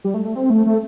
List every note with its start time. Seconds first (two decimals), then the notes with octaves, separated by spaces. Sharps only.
0.04 G3
0.14 A3
0.25 A3
0.35 C4
0.50 A3
0.66 A3